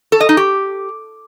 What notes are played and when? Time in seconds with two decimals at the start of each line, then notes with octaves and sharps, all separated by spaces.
0.12 A4
0.21 D#5
0.29 D#4
0.37 G4